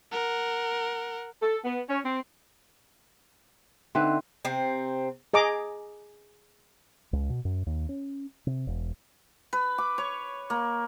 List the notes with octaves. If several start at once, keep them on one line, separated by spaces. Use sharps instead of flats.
A#4 F#5
A4
B3
C#4
C4
D3 C4 D#4 B4 E5 C6
C3 C4
G#4 D#5 A#5 D6
C#2
B2
F#2
D#2
C#4
C3
E1
B4
D6
C#5
A#3